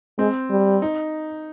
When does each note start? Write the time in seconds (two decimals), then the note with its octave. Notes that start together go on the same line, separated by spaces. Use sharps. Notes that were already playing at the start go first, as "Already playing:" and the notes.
0.19 G#3 C4
0.50 G3
0.82 D#4